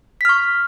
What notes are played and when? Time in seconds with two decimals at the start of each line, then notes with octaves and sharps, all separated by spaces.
0.21 B6
0.25 F6
0.29 C#6